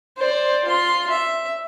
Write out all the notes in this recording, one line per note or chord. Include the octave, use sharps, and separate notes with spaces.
C5 D5
F4 C6
E5